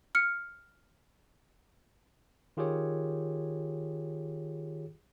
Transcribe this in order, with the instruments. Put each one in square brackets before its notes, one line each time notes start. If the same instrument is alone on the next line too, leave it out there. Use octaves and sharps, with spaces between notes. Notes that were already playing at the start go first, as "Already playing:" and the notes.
[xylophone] F6 C#7
[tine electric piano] D#3 F4 G4 G#4 C#5